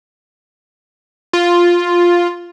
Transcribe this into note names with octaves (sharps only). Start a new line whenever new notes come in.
F4